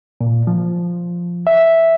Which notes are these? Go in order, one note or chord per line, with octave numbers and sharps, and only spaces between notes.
A#2
F3
E5